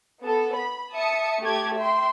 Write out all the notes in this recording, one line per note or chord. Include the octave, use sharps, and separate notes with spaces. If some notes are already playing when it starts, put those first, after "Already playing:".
B3 A4
B5
E5 A5 D#6 C#7
A3 G4 D6 G#6
E5 G5 C6